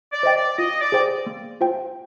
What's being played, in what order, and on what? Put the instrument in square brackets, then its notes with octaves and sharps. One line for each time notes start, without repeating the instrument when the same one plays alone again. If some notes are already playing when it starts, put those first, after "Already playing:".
[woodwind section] D5
[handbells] C5 D#5 G5
[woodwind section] D5
[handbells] F4 [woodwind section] D#5
[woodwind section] D5
[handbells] G#4 C5 G5
A#3
F4 C5 G5